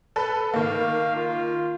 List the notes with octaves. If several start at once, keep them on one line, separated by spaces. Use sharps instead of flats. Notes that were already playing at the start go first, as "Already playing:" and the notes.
A4 B4
D#3 A#3 F5
F4